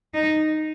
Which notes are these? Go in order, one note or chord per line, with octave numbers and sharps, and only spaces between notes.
D#4